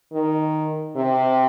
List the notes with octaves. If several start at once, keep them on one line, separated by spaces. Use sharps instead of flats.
D#3
C3